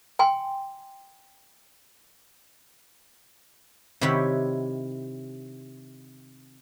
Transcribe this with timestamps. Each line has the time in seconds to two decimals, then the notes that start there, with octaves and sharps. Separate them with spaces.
0.19 G5 G#5 C6
4.01 C3 D#3 E4 G4 C#5 F#5